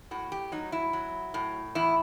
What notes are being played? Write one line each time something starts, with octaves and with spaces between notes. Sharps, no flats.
A2 F#4
G4
F#3 D#4
E4
F#3
A2
E2 E4